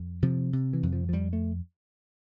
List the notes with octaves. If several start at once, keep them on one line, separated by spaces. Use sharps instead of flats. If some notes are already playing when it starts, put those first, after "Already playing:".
Already playing: F2
C3 F3
C3
E3
F2
F3
F3
F2 G3
A3